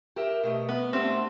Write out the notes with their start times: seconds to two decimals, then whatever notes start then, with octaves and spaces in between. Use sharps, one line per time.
0.16 G4 A#4 E5
0.43 B2 A3 D#5
0.69 B3
0.93 A3 C4 D4 G4